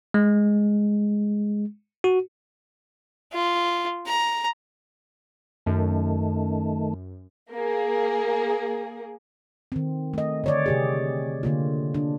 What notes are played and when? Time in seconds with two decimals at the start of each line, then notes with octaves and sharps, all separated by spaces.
0.14 G#3
2.04 F#4
3.33 F4
4.07 A#5
5.66 F#2 D#3 A3
7.52 A#3 G#4
9.72 D#3 C4
10.14 A3 D#5
10.44 D3 C#5 D5
10.66 C3 G4 G#4
11.43 D3 A#3 F4
11.94 D4